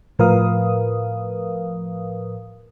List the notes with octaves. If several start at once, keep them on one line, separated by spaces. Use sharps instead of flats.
A2 F3 A#4 B4 F5 D#6